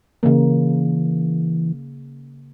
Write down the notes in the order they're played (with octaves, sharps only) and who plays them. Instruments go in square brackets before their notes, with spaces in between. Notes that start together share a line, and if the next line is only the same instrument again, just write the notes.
[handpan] C#3 A#3 [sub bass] E3